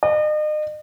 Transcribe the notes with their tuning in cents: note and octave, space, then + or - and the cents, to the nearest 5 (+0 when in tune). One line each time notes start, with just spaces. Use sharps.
D#5 -40